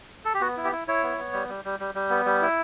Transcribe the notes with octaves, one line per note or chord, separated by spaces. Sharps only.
A4
G4
B3 F#4
E4
G4
E4
E4 C#5
B3
B3
G3
G3
G3
G3
G3
B3
G3
E4